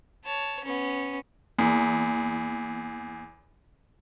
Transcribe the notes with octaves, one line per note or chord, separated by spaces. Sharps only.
C#5 A5
B3 C#4
E2 A#3